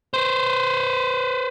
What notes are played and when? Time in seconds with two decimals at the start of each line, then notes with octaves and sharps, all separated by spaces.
0.14 B4 C5